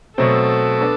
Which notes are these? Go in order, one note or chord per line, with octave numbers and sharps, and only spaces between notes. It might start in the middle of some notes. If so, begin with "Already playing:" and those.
B2 F#3 A3 C4 A4
B3 D4